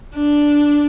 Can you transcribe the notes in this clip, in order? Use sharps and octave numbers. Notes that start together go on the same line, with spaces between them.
D4